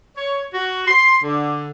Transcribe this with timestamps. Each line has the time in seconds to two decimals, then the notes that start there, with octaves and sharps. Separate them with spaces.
0.16 C#5
0.54 F#4
0.87 C6
1.24 D3